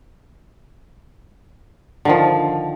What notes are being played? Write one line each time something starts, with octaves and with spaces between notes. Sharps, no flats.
D3 D#3 F3